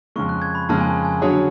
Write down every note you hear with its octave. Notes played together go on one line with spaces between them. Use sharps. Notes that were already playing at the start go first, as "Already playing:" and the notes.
F2 C#3 G#3 C#6
F#6
G#6
B5
F2 C#3 G#3 A5
G#5
G#5
D3 F#3 C#4 G#4 C#5